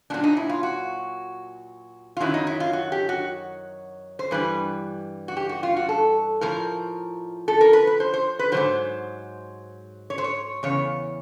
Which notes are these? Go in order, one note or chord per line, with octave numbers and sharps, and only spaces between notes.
A#2 F#3 D4
D#4
E4
F4
F#4
F4
F#2 D#3 F#3 E4
D#4
E4
F4
F#4
G4
F#4
C5
G2 E3 G3 B4
F#4
G4
F#4
F4
F#4
A4
A2 F3 A#4
A4
A#4
B4
B4
C5
C5
B4
G#2 D#3 F#3 C5
C#5
C5
C#5
E2 C#3 C#5